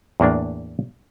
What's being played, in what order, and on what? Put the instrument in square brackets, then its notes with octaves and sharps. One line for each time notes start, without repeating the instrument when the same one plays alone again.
[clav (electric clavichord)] E2 A2 A#3 D4